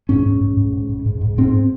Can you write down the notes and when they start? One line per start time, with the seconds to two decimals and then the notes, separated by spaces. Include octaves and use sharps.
0.09 G#2 C#4
0.26 G#2
0.41 G#2
0.57 G#2
0.73 G#2
0.89 G#2
1.06 G#2
1.21 G#2
1.38 G#2 C4